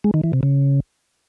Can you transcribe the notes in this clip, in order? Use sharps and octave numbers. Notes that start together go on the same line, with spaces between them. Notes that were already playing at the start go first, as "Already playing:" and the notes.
G#3
D#3
E3
C3
C#3